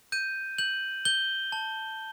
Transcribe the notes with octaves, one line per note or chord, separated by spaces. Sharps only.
G6 D#7
G6 F#7
G6 G7
A5